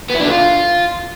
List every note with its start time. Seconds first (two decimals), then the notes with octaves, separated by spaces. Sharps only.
0.10 B3
0.15 E4
0.20 D4
0.25 D3
0.30 F4